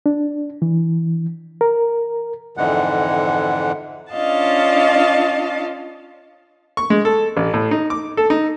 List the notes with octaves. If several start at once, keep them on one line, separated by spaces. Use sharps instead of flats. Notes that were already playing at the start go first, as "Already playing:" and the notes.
D4
E3
A#4
F2 G#2 D3 E3 G#3 F#5
C#4 D4 F4 D#5 F5 A5
C#6
G#3
A4
A1
A2
D#4
D6
A4
D#4